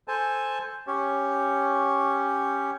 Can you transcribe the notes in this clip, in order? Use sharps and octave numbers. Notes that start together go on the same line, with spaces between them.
A4 C5 G#5 A5
C#4 G4 C#5